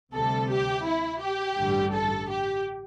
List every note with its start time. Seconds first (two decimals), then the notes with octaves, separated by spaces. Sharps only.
0.14 D2 C3 G3 A4
0.50 G4
0.85 E4
1.21 G4
1.57 A1 G2 D3 G3
1.93 A4
2.29 G4